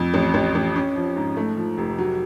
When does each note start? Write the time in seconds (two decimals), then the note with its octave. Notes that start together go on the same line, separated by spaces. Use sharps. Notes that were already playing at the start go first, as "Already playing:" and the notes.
Already playing: F2
0.14 A1
0.34 A1
0.55 A1
0.76 C#4
0.96 F3
1.16 G#2
1.37 A3
1.57 F3
1.78 F1
1.98 F#3